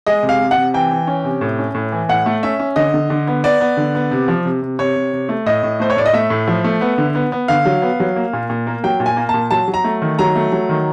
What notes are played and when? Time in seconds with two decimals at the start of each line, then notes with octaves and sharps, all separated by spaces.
0.07 G#3 D#5
0.23 C3
0.29 F5
0.41 C3
0.51 F#5
0.57 C3
0.74 E3 G5
0.91 E3
1.07 C#4
1.24 C3
1.41 A2
1.59 C#4
1.75 A2
1.92 E3
2.09 A2 F#5
2.26 A3
2.43 C#4 E5
2.59 C#4
2.76 D3 D#5
2.94 D3
3.10 D3
3.27 B3
3.44 B3 D5
3.60 B3
3.77 D3
3.95 B3
4.11 C3
4.28 F3
4.45 C3
4.62 C3
4.79 C3 C#5
4.96 C3
5.13 C3
5.29 A3
5.46 A2 D#5
5.63 A2
5.80 A3 C5
5.90 C#5
5.97 A2 D5
6.06 D#5
6.13 A3 E5
6.30 A2
6.48 F3
6.64 A3
6.81 B3
6.98 D3
7.15 B3
7.32 B3
7.48 D3 F5
7.65 F#3
7.82 B3
8.00 F#3
8.16 A#3
8.33 A#2
8.50 A#2
8.67 A#3
8.84 F#3 G5
9.00 A#2
9.06 G#5
9.17 A#3
9.29 A#2 A5
9.51 F#3 A5
9.68 F#3
9.74 A#5
9.84 A3
10.02 D#3
10.19 F#3 A#5
10.35 A3
10.52 F#3
10.69 D#3